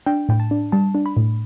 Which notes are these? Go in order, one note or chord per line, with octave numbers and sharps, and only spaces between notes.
D4 G5
A2 G5
A5
D4
G3 A5
D4
B5
A2